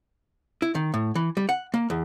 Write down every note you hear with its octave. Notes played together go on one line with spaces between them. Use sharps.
E4
D#3
A2
E3
G3
F#5
A#3
E2